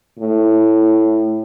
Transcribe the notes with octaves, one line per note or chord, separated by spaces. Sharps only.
A2